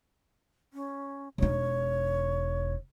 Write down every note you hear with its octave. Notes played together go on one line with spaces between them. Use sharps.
C#4
E1 D#4 C#5